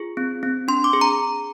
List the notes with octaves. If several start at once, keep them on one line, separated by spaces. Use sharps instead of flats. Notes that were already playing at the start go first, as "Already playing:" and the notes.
Already playing: F4 G#4
C4
C4
D4 C6
D6
G#4
A#5